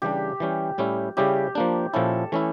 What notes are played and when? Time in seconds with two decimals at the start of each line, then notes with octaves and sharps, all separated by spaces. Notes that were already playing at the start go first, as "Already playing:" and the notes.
0.02 C#3 E3 G3 D4 G4
0.40 E3 G3 C#4
0.78 A2 G3 C#4 E4
1.17 C#3 G3 C#4 E4 G4
1.55 F3 A#3 D4
1.94 A#2 F3 C#4 E4 A4
2.32 E3 A3 C#4 E4